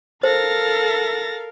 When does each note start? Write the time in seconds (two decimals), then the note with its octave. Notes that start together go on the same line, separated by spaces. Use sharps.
0.23 A4 A#4 C5 F5 A6 A#6